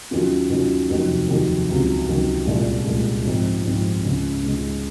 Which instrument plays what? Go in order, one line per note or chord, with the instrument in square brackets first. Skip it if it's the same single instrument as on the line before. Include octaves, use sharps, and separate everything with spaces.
[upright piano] D#2 D#3 F#3 C#4 F4
D#2 D#3 F#3 C#4 F4
F1 D#2 D#3 F#3
F1 D#2 D#3 F#3
C#2 C3 D#3 F#3
C#2 C3 D#3 F#3
C2 A#2 G#3
C2 A#2 G#3
G#1 G#2 F3 C4 D#4
G#1 G#2 F3 C4 D#4
C#2 C#3 G#3
C#2 C#3 G#3